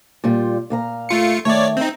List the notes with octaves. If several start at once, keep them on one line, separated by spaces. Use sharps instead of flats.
A#2 G3 F4
A#2 F5 A#5
A3 F4 C#7
D#3 A3 C#5 D5
C4 D#4